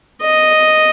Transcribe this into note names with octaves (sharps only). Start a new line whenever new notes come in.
D#5